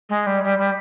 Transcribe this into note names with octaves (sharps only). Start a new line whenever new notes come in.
G#3
G3
G3
G3